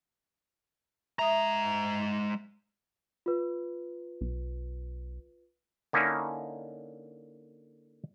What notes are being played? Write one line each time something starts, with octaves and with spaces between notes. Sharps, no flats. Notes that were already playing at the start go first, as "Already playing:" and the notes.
G#3 E5 A#5 D#6
F4 B4
B1
D3 A#3 C#4 D#4 E4